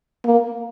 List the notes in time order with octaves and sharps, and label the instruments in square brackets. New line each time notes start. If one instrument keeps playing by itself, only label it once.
[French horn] A#3